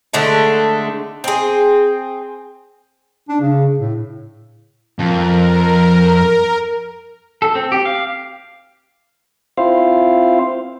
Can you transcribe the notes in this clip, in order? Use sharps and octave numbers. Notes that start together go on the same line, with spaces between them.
D3 G#3 A3 D4
C4 G#4
D4
C#3
A2
F2 A#4
A4
C4
G4
F5
C4 E4 F4 C5 F5